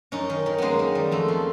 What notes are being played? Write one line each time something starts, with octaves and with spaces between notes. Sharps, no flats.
F#2 C#4 D#4
D#3
D#3
F#2 G#3 A#3 B3
D#3
G3
F2 A3
F3